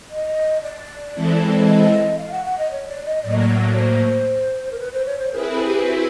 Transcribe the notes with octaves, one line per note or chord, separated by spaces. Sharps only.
D#5
D5
E3 G#3 C4 E4 A4
D#5
F5
F#5
F#5
D#5
C#5
D5
D#5
A2 F#3 A#3 D5
D#5
D5
C#5
C5
A#4
B4
C5
C#5
C5
C4 E4 G#4 A#4 B4
A4
G4
F#4